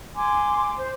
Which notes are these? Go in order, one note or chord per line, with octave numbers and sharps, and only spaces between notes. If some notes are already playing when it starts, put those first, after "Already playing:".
G#5 C6 D6
C5